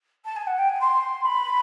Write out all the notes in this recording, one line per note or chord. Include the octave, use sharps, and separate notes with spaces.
A5
G#5
F#5
G5
G#5
C6
B5